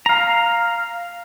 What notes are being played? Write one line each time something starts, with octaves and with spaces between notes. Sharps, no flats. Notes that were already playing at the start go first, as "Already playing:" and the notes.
F5 A#5